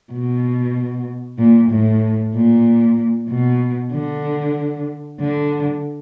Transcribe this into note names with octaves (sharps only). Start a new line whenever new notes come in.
B2
A#2
A2
A#2
B2
D3
D3